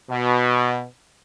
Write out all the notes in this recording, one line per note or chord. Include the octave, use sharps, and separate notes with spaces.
B2